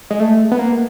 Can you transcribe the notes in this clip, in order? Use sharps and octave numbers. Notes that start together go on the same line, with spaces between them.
G#3
A3
B3
A#3